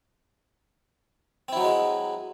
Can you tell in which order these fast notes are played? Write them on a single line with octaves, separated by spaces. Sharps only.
C4 E4 F#3 D#4 G#3